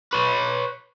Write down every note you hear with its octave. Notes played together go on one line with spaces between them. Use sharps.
B4 C#5